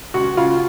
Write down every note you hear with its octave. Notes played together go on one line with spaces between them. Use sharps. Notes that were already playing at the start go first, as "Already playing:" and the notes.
C#2 F#4
C#3 F4